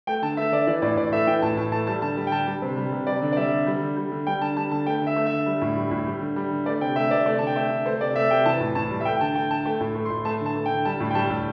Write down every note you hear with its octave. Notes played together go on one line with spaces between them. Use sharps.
A3 G5
D3 A5
A3 E5
D3 D5
E3 D5
A2 D5
A2 D5
A3 E5
E3 G5
A2 A5
A2 A5
A3 A5
G3 A5
D3 A5
G3
G5
D3 A5
G3
C3
G3
C3
G3 D5
D3
D5
G3 E5
D3
G3
D3
G3
D3
G3 G5
D3 A5
G3 A5
D3 A5
A3 G5
D3
E5
A3
E5
D3
G3
A2
G3
A2
G3
D3
G3
D3
A3 D5
C3 G5
A3 E5
C3 D5
A3 D5
D3 A5
G5
A3 E5
D3
A3 C5
C3 D5
A3 E5
C3 G5
E3 A5
A2
A2 A5
G3
E5
A3 G5
G5
D3 A5
A3 G5
D3 A5
A3 G5
A2
A3
C6
A2
A3 A5
D3
A5
A3
G5
D3
G3 A5
A2
G5
G3 A5
A2